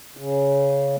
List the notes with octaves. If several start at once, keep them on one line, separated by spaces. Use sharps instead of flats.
C#3